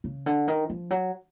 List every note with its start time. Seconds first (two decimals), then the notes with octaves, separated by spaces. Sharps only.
0.04 C#3
0.26 D3
0.48 D#3
0.70 F3
0.90 F#3